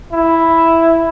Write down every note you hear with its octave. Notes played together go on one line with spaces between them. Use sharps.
E4